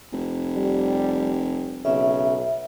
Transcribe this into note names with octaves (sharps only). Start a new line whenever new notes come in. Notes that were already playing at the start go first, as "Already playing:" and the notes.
F1
G3
B1 C#3 E5